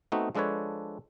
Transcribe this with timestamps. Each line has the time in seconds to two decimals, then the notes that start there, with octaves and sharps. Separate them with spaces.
0.12 A3 B3 C4 D#4 F#4
0.35 F3 G#3 D4 A4 B4 C#5